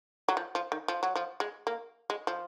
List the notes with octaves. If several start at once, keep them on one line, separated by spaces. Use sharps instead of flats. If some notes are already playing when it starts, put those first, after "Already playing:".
F#3
F3
F3
D#3
F3
F#3
F3
G#3
A#3
G#3
F3